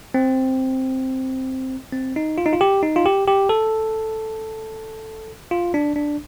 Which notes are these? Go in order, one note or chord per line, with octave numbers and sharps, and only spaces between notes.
C4
C4
D#4
F4
D#4
F4
G4
D#4
F4
G4
G4
A4
F4
D4
D4